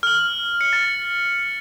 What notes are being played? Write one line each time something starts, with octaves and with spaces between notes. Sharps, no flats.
F6 F#7
C#7
A6